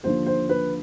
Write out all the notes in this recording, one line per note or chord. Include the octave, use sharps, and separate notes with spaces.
D#2 D3 F3 C5
C5
B4